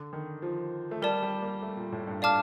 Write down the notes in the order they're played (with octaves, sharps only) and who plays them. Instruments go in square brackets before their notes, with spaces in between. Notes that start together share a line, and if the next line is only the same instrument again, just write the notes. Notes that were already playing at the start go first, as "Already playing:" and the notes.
Already playing: [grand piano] D3
D#3
F3
A3
[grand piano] G3 [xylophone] A#4 D5 A5
[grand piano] G3
A#3
A3
A#2
A2
G2
[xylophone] D5 F5 A5 D6 F6